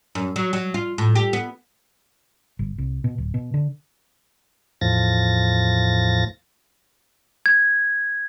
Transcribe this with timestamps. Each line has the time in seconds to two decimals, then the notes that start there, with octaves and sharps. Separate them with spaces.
0.15 F#2
0.36 F#3
0.53 F#3
0.74 F4
0.98 A2
1.16 G4
1.33 B3
2.59 G1
2.78 C2
3.04 B2
3.18 D1
3.34 B2
3.54 D3
4.81 E2 A2 F3 A6 A#6
7.46 G#6